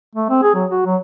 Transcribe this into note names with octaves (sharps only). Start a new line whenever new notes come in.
A3
C4
G#4
F#3
F#4
F#3